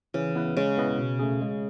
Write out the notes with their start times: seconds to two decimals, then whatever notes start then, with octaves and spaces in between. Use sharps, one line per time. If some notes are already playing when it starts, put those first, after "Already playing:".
0.14 C#3 E3
0.35 B3 E4 B4
0.57 C#3 G#3
0.77 B3 E4 B4 D#5
0.98 B2
1.19 A3 C#4 G#4
1.41 G#3